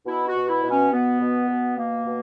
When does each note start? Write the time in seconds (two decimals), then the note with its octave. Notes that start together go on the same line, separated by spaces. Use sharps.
0.06 B2 E4
0.27 F#4
0.36 B2
0.49 E4
0.63 B2
0.70 C#4
0.91 B2 B3
1.20 B2
1.48 B2
1.77 B2 A#3
2.05 B2